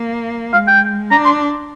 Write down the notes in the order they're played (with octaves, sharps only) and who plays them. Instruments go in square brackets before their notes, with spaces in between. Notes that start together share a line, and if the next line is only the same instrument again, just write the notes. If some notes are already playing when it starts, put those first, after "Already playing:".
Already playing: [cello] A#3
[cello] G#3 [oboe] F5
[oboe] G5
[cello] D4 [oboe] A#5
[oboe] C6